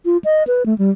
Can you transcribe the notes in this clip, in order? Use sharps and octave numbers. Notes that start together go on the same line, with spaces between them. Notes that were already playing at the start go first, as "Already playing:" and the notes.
F4
D#5
B4
A3
G3